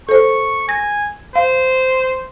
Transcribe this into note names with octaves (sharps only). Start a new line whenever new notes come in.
A4 C5 C#6
G#5 A#6
C5 F5